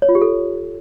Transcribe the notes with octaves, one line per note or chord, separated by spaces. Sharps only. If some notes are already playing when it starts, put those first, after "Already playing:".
C#5
F4
G4
A4